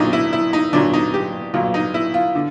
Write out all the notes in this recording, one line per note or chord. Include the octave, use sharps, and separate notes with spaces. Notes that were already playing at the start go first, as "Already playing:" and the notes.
Already playing: B1 A#2 F#3 D4 D#4
E4
E4
D#4
B1 A#2 F#3 D4
D#4
G4
B1 A#2 F#3 F4
D#4
E4
F4
D3